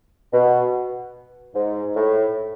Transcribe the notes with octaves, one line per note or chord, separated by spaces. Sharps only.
B2
G#2
A2